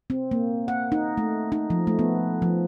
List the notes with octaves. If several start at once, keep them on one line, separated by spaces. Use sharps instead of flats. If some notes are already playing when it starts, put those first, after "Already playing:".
C4
A#3
F#5
D#4
A3
D#4
F3
A3
B3
F3